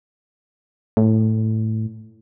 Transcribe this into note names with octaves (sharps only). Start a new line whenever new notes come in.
A2